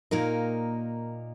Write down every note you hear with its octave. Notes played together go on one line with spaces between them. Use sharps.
A#2 A#3 D#4 A#4